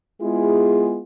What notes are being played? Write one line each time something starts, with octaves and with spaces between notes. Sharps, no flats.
G#3 B3 E4 F4 G#4